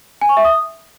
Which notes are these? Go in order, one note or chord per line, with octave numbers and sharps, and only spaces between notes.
G#5
C#6
E5
D#6